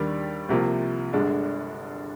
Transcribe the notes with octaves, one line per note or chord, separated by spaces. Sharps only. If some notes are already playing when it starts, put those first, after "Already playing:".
Already playing: D#2 D#3 G3 D4
C2 C3 F3 A#3
G1 G2 D3 G#3 D4